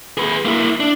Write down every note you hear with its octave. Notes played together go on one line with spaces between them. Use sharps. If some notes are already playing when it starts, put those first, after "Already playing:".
G#4 B4
A#3 E4
D4